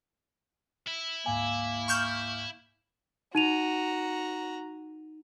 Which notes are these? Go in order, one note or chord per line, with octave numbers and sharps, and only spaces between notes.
E4
D2 G#2 A#3 G#5
C#6 F6 G6
D#4 F#4 A#5 D#7 F7